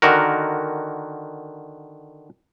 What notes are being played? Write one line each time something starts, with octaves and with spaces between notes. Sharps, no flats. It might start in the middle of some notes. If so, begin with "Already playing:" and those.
D3 D#3 F#4 A#4